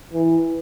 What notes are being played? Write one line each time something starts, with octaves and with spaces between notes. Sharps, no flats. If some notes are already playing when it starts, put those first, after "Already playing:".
E3